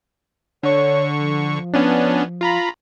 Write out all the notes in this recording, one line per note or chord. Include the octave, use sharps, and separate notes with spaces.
D3 C#5 C#6
F3
B3 C#4 D4
F4 A#5 B5